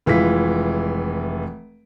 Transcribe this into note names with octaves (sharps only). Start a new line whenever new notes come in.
F1 E3 G#3 F4 B6